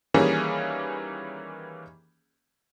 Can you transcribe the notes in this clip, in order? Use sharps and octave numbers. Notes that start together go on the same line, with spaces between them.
D#3 E3 G3 A#3 C#4 G#4